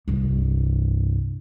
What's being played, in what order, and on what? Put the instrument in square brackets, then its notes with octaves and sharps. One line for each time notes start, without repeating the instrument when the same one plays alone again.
[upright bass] C2 G2